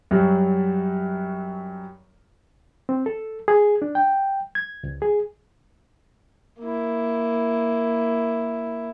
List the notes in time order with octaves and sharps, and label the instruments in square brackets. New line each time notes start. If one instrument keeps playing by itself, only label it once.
[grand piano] F#2 F#3 G3
[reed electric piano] C4
A4
G#4
D4
G5
G#6
C#2
G#4
[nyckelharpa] A#3 E4